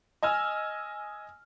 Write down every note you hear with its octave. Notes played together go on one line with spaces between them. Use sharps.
D#5 G#5 E6 F6